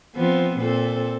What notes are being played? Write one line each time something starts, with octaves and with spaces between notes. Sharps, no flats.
F3 B3 C4
A#2 C4 A4